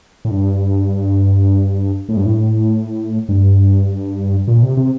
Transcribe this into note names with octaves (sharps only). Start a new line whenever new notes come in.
A2
G2
A2
G2
A2
G2
A#2
C3
C3